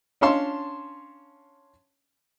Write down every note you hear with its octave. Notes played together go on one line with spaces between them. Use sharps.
C#4 D4 C#5 F5 A5 C6